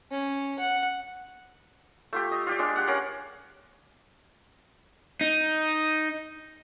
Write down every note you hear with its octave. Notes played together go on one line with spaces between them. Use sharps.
C#4
F#5
A3 F4 G4
D#5
F4 G4 D5
G#3 D4 F4
G4 F#5
C#4 A#4 F5 F#5
D#4